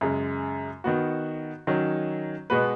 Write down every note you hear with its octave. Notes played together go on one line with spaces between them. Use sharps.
F#2 C#3 G#3
D#3 B3 F#4
D#3 F#3 C#4
B2 G#3 B3 F#4 B4